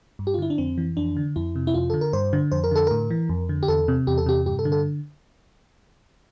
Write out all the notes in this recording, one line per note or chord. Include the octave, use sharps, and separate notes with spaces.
G2
G4
F4
D3 E4
D4
F2 C4
E3
F2 D4
D3
F2 E4
C3
E4
F2 F4
D3 A4
A#4
G2 C5
D3
F2 C5
A#4
D3 A4
A2 A#4
E3
F2
D3
G4
E2 A4
C3
E2 G4
A4
C3 G4
G2 G4
A4
D3
A4